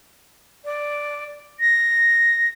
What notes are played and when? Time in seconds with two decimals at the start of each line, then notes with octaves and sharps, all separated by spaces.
0.64 D5
1.60 A#6